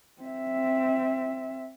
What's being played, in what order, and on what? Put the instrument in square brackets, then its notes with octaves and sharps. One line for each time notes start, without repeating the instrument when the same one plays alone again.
[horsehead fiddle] C4 E5